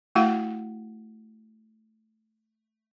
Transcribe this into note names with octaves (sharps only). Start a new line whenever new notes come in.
A3 E4 F#4 F5 F#5